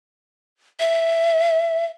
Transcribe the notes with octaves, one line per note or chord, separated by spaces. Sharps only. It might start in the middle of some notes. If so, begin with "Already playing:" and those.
E5